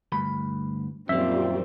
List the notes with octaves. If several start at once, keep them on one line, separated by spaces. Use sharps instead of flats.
D2 G2 B5
F#2 A#2 D#3 F3 G3 C4 E5